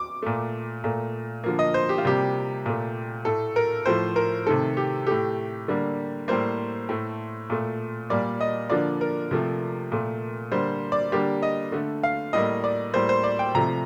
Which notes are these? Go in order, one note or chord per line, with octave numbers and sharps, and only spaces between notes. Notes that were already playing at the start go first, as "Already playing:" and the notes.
Already playing: D6
A#2 A3
A#2 A3
D3 F3 A#3
D#5
C5
G4
F4
C3 G3 A#3 G4
A#2 A3
A2 A3 A4
A#4
A2 F3 A3 C5
A#4
C3 D#3 A3 A4
G4
A2 A3 G4
D3 G3 A#3
A2 G3 A#3 C5
A2 A3
A#2 A3
A#2 G3 A#3 D5
D#5
D3 F3 A#3 D5
A#4
C3 F3 A3
A#2 A3
D3 G3 A#3 C5
D5
D3 G3 A#3 G4
D#5
D3 A3
F5
A2 G3 A#3 D#5
D5
A2 G3 A#3 C5
C5
D5
G5
C3 F3 A3 A#5